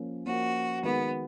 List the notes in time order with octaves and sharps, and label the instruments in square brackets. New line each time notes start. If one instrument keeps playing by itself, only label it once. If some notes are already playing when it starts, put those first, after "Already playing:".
Already playing: [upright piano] F3 A#3 C#4 F4 A#4
[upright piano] F3 A#3 C#4 F4 A#4 [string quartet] F#4
[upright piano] D#3 G#3 D#4 F#4 A#4 [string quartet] B3